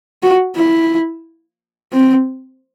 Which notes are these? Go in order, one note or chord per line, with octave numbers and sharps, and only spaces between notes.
F#4
E4
C4